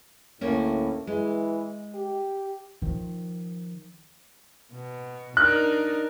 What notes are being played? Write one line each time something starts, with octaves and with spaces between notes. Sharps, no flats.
D2 A2 A#3 C#4
E3 G#3
G4
D#3 F3
B2
D4 D#4 A#4 F#6